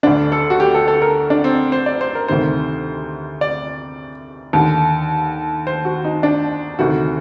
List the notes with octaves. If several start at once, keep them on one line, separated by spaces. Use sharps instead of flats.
D2 D3 D4
A4
F#4
G4
A4
A4
A#4
D4
C4
C5
D5
C5
A#4
D2 C3 D#3 C5
D5
D#2 D3
C5
F#4
D#4
D4
D2 C3 D#3 F#4